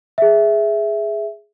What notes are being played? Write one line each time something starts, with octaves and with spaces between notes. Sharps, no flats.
G#4 E5